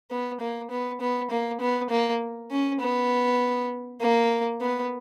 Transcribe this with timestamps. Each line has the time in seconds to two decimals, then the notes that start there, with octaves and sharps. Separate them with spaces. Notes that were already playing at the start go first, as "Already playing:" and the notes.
0.11 B3
0.40 A#3
0.70 B3
1.01 B3
1.30 A#3
1.60 B3
1.90 A#3
2.51 C#4
2.81 B3
4.01 A#3
4.61 B3